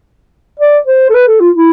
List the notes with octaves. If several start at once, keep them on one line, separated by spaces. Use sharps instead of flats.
D5
C5
A4
B4
A4
F4
E4